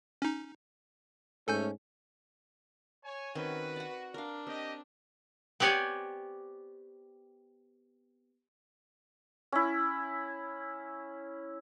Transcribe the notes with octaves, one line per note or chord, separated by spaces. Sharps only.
C#4 D#4
G#2 A3 C#4 A4 G#5 G6
C#5 G#5
D#3 C4 C#4 F#4 B4
D5 F#5
D4 A#4 F5
C4 G4 D#5
B3 C4 G4 C#5 D5 G#5
C#4 E4